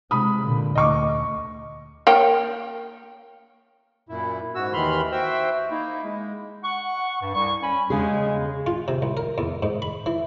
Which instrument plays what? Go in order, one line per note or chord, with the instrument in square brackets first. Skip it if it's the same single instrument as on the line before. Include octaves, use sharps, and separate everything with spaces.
[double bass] C3 G#3 [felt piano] B5 D#6
[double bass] A#2 D3
[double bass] D2 [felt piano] D#5 C#6 D6
[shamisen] A#3 C#5 G5
[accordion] F#2 A#2 E4
G#2 F#4 E6
D#2 D#3 E3 B5 C6 F6
F#4 C5 E5 G5 E6
A#3 D#4 E4
G#3
[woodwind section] F#5 C#6
G2
C2 G3 C#6
C#4 G#5 B5
[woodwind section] E2 G#3 [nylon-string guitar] C#3 G#4
[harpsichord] F4
C3
C2
A#4
E2
G#2
B5
E3